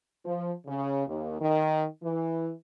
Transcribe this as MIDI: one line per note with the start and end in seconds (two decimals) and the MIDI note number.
0.25 0.52 53
0.67 1.02 49
1.07 1.38 39
1.40 1.85 51
2.03 2.51 52